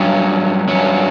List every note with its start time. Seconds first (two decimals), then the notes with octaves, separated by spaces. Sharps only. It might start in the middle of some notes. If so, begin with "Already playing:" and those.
Already playing: G2 F#3 C#4
0.68 G2 F#3 C#4